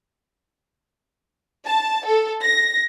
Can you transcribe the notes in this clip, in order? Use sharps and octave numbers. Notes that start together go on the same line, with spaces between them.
A5
A4
A#6